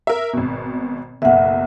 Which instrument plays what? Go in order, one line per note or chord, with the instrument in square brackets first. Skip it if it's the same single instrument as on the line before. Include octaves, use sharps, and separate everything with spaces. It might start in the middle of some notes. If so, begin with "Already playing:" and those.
[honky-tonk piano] A#4 E5
G#1 B2
[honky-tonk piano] F#1 B1 [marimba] E5 F#5